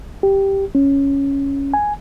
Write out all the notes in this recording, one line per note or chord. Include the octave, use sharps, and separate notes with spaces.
G4
C#4
G#5